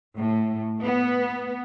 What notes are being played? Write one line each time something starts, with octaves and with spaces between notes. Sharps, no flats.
A2
B3